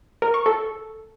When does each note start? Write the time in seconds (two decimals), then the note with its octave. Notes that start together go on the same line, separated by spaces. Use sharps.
0.22 A#4
0.34 C#6
0.46 A4